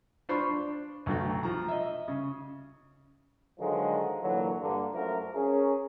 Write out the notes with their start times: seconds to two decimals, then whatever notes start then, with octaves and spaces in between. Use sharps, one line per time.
0.29 D4 F4 C5 B5 C#6
0.49 D4
1.06 B1 D3 A3 F#4 G5
1.43 F3 A#5
1.68 D#5 E5
2.08 C#3
3.60 D3 D#3 F3 F#3 G#3 D#4
4.23 A#2 D3 E3 F#3
4.60 G2 D3 A#3
4.94 F#2 F3 A3 A#4
5.35 C#4 G#4 A#4